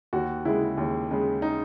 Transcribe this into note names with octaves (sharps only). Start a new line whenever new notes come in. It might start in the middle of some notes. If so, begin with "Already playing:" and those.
D#2 F#4
C#3 G#3 E4
D#2
C#3 G#3
D#4